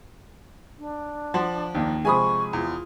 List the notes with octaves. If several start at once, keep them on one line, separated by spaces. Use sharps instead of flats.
D4
F3 F#5 A5 C6
D#2 A#3
C3 F3 G#3 G#5 B5 C#6 D#6
E2 F4